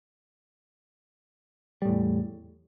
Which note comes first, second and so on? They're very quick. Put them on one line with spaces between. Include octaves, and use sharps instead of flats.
G3 A2 E2